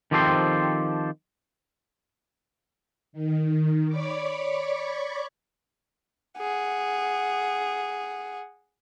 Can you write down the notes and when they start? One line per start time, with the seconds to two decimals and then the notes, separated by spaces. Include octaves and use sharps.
0.11 D#3 F3 C4 G4 A4 C5
3.13 D#3
3.88 C#5 D5 B5 C#6 D6
6.38 G#4 F#5